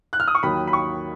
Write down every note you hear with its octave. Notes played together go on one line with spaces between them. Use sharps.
F#6
F6
D#6
C#6
D#2 D#3 F#3 B5
B5
C#6